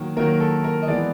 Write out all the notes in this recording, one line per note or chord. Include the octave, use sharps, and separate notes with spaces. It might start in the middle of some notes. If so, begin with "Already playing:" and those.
Already playing: D#3 F#3 A#3
D#3 F#3 A#3 A#4
A4
A#4
D#5
E3 G#3 B3 D5